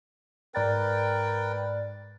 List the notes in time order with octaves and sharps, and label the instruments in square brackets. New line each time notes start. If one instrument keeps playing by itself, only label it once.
[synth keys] G#2 D5 A6 [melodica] A#4 B4 G5